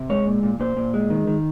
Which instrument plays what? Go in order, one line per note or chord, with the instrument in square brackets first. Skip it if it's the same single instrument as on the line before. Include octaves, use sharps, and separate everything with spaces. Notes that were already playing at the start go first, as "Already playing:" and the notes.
Already playing: [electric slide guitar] C3
G#3 C#5
A#2
A#2
A#2 C5
A#2
G#3
D#3
D#3